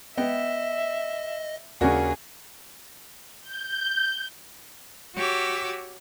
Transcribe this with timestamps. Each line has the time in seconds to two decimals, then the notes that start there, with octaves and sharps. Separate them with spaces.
0.18 B3 D#5 E5 G5
1.81 D#2 C#3 C#4 D4 F#4 G#4 A#4
3.41 G6
5.15 F#4 G4 C#5 D6 E6